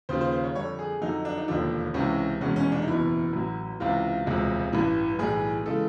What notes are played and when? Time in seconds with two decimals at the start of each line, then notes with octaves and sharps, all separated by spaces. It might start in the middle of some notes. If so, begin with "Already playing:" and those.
0.09 D#2 C#3 F3 C5
0.21 C5
0.32 C5
0.44 C#5
0.55 F2 D3 G3 C#5
0.79 G#4
1.02 F2 D3 F#3 D#4
1.25 D4
1.38 D#4
1.48 E1 D#2 D3 F3 D4
1.94 C#2 C3 E3 C#4
2.41 F1 E2 B2 G#3 C#4
2.56 C#4
2.72 D4
2.82 D#4
2.87 F#1 E2 B2 E4
3.33 A1 A2 F#3
3.80 C#2 C3 E3 F4
4.26 E1 D2 C3 F3 G#3
4.73 A1 G2 E3
5.19 B1 A2 E3 G3 G#4
5.66 C#3 E3 G#3 A4